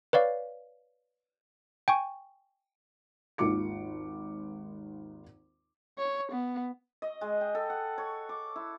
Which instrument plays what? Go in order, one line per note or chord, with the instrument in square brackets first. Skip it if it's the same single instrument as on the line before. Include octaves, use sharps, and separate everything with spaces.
[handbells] B4 C#5 D5 F5
G5 G#5 C#6
[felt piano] G#1 D#2 F4 D6 C#7
[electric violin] C#5
B3
[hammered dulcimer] D#5
G#3
G5
A4
F#5
C#5
D6
E4